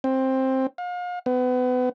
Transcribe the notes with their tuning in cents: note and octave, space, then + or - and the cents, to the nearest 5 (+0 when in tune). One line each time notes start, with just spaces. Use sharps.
C4 +10
F5 +40
B3 +30